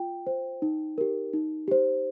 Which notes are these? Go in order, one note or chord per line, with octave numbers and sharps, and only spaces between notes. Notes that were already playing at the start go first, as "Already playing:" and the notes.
Already playing: F4 G5
C5
D#4
G4 A#4
D#4
G4 C5